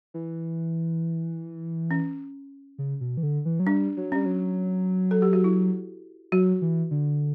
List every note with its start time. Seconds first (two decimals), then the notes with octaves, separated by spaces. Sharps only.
0.14 E3
1.91 C#4
2.78 C#3
3.01 B2
3.17 E3
3.23 D3
3.45 E3
3.60 F#3
3.67 G3 D4
3.97 F#3
4.12 G3 C#4
4.25 F#3
5.11 A4
5.22 G4
5.33 F#4
5.44 E4
6.32 F#3 F#4
6.62 E3
6.91 D3